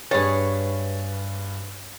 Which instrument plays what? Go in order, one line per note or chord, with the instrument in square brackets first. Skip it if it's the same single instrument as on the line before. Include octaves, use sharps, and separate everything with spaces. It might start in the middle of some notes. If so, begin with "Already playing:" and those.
[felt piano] G2 B4 A6 [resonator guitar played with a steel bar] G#4 C#5